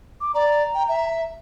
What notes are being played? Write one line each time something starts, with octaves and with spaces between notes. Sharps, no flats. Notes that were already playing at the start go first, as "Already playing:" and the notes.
D6
D5 A#5
G5
E5